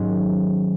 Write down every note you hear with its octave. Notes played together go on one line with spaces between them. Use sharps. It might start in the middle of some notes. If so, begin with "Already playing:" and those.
Already playing: G#2 D#3 F#3 C#4 F#4